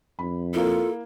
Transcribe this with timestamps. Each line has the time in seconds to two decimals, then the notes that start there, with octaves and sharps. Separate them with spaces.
0.19 F2 B5
0.54 A#3 E4 F4 A4